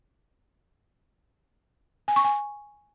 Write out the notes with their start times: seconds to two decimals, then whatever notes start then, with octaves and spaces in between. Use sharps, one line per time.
2.08 G#5
2.16 C#6
2.24 G#5